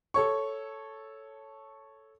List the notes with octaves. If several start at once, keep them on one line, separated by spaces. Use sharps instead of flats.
A4 C#5 C#6